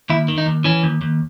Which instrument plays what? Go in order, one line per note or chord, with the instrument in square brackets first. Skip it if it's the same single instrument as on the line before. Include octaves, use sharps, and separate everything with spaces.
[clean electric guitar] D#2 E4
D#3
D#4
D#2
E3 C#4
D#2
D#2